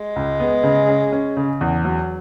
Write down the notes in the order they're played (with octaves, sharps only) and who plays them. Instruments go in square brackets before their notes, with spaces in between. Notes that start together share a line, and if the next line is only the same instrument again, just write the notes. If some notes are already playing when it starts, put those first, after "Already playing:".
Already playing: [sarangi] G#3
[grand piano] C#2
B3
C#3
C#4
C#4
C#3
E2
F#3